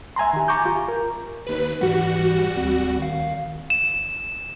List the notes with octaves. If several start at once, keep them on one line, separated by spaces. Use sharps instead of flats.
E5 G#5 A#5 C6
D#3 G4
G#5 A#5 C#6 D6 G6
F4 G4
A#4
D#2 B4
G#2 E3 G3 F#4 F#5
D2 C4
D#3 F5
E7